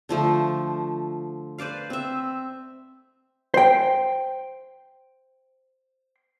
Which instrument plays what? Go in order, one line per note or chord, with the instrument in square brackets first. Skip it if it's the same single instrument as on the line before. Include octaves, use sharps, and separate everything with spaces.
[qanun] D3 F3 A3
B4 C5 D5 F5
C4 E5
[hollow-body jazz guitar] C5 G5